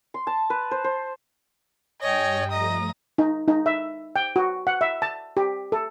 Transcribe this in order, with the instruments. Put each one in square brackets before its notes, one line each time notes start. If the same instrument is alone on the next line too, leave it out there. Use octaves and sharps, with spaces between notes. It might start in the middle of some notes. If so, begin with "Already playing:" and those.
[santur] C6
A5
B4
C5
C5
[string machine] G2 G3 [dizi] C#5 [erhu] D#5 [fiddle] G5 G#5
[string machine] F3 A3 [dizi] D#5 [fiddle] A#5 [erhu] D#6
[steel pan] D#4
D#4
E5
G5
F#4
F#5
E5
A5
G4
A4